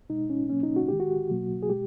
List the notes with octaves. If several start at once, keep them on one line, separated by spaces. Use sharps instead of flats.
B2 G#3 D#4
C#4
B2 F#3 A#3 C#4
D#4
F#4
D#3 G#3 G4
F#4
B2 F#3 A#3
G#4
B2 G#3 G4